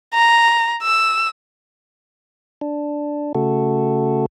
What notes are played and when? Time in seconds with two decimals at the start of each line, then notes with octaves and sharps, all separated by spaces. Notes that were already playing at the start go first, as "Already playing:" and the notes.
0.14 A#5
0.83 E6
2.61 D4
3.35 C#3 A3 F#4 A4